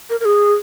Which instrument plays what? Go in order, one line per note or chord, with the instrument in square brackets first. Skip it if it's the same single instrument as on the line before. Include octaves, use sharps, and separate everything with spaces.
[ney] A#4
A#4
G#4